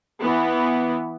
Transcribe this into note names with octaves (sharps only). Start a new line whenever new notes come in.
E3 B3